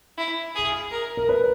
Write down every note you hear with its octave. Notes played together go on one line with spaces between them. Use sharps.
E4
G#4
A#4
A#4
B4